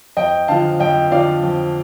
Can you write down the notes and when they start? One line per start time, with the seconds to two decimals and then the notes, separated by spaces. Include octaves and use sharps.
0.17 F2 D#5 G5
0.48 D3 F3 F5 A5
0.80 F2 D#5 G5
1.12 D3 F3 D5 F5
1.43 F2